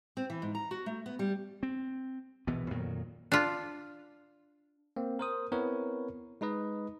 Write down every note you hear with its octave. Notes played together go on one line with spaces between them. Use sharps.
C4
E3
G#2
A#5
F#4
A3
B3
G3
C4
A#1 B2 E3 B3
F2 A#2 D#3 F#3
D4 F4
A#3 C4
A#4 C5 D#6
B3 C4 E4 A#4 B4 C#5
G#3 D#4 B4 D#5